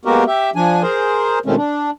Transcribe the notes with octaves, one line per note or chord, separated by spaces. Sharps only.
G#3 A#3 B3 F#4 G4 A#4
G4 E5
F3 D4 G#5
G#4 A#4 C5
B2 D#3 G#3 A3 C4 C#4
D4